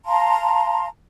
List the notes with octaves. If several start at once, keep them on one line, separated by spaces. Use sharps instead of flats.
F5 A5 A#5 C6